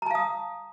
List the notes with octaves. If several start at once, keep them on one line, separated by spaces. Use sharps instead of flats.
F5 A5 A#5 D#6